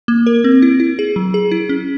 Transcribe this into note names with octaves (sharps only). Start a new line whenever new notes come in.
A#3
A#4
C4
E4
E4
G#4
F#3
G#4
E4
C#4